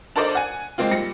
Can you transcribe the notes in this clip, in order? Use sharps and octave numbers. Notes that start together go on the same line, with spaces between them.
D4 A4 A#4 C5 D5 D#5
F#5 G#5
F3 G#3 A#3 C4 F4
A#2 G3 A#6 C#7